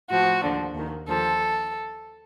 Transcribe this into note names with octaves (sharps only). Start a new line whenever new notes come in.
A2 F3 F#4
D#2 D3 F3
D#2 D#3
D#2 D3 F3 A4